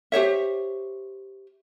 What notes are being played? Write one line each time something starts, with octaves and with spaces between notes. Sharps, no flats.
G4 C5 C#5 E5